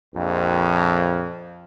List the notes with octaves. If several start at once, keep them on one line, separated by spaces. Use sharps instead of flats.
A#1 F2